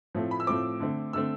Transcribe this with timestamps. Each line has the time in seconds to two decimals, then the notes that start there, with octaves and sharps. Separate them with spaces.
0.15 A2 F3 A3 C4
0.31 B5
0.40 E6
0.47 A2 F3 A3 C4 D6
0.80 D3 A3 C4
1.13 D3 A3 C4 E6